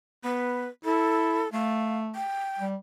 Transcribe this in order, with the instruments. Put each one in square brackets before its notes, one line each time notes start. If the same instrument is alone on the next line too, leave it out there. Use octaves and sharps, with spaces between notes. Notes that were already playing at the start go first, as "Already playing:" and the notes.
[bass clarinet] B3 [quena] B4
[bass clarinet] E4 [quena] A4
[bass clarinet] A3 [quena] F5
[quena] G5
[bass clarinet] G3